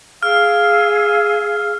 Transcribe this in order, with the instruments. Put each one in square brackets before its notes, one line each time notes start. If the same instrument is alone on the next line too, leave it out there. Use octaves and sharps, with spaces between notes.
[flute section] G#4 F5 E6 [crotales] F6